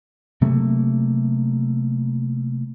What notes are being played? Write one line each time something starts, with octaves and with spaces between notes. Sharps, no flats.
C3 F#3 A3 A#3